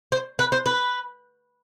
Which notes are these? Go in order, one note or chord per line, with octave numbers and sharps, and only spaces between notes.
C5
B4
C5
B4